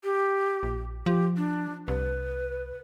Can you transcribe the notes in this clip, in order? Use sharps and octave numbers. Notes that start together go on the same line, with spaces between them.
G4
A#1
F3 G4
D4
C2 B4